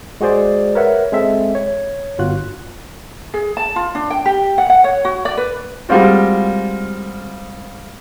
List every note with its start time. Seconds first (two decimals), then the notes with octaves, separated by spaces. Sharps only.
0.21 G#3 F#4 G#4 C5 D5
0.75 A#4 B4 C#5 E5 F#5
1.12 G#3 C4 A4 E5
1.55 C#5
2.19 G1 F4 F#4 F#6
3.34 G#4
3.57 A5
3.76 F4
3.95 D4
4.10 G5
4.25 G4
4.58 F#5
4.70 F#5
4.84 C#5
5.05 F#4
5.25 D5
5.37 B4
5.89 G3 G#3 A#3 C4 F4 F#4